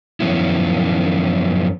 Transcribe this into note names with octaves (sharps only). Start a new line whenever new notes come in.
F#2 D#3 F3 B3 C#4 E4